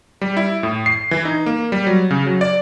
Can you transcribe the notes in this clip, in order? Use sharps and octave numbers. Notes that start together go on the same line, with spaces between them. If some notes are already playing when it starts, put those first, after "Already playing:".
G3
E4
A2
C7
E3
D#4
A#3
G3
F#3
C#3
F#3
D5